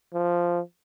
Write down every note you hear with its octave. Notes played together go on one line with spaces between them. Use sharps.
F3